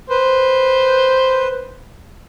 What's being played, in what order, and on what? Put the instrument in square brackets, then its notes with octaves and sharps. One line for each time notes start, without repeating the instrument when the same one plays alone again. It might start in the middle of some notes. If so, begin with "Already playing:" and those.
[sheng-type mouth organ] B4 [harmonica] C5